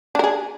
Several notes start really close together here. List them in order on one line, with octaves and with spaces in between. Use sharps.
D4 A#4 G#4